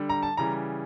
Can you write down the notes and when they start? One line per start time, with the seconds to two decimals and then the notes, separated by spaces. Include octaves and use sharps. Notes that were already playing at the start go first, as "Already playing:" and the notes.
Already playing: D3 G3
0.09 A#5
0.23 A5
0.37 C#3 E3 G3 A#5